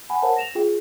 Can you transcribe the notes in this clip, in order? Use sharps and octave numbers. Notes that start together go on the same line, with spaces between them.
F#5 G#5 B5
A#4 C5 C#5 F5 F#5 A5
A#6 E7 F7
F4 G#4 G5